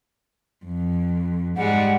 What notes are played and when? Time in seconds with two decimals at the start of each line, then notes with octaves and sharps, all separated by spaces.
0.64 F2
1.57 G#2 G3 G#3 F#5